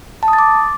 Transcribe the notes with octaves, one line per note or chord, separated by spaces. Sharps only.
A5
D#6
A6
D6